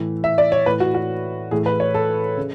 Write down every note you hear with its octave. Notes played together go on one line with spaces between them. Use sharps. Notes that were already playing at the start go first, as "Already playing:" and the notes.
Already playing: A2 E3
E5
D5
C#5
A2 E3 B4
F#4
F#4
A2 E3 G#4
B4
C#5
A4
C#3